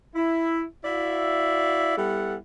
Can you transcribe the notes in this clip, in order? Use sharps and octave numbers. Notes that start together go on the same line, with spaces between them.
E4
E4 F#4 D5 E5 F5
G3 B3 E4 A4 F#5